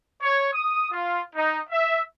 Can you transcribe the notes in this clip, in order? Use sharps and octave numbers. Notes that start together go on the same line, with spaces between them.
C#5
D#6
F4
D#4
E5